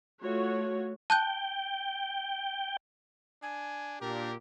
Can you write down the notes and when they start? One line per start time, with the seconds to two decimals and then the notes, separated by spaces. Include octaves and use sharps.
0.23 A3 F4 F#4 C#5
1.10 G5 A5 F#6 G6
3.42 D4 G#5
4.01 A#2 D4 G4 A#4